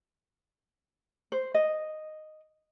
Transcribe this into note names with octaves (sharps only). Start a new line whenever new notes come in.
C5
D#5